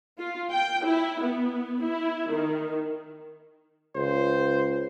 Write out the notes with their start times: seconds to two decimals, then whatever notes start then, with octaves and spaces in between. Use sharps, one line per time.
0.19 F4
0.52 G5
0.86 E4
1.21 B3
1.83 E4
2.32 D#3
3.96 C#2 C5